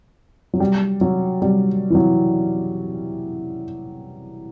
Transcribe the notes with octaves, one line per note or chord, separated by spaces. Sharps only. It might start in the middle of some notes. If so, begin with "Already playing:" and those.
F#3
G3
F#3
G3
E3
F#3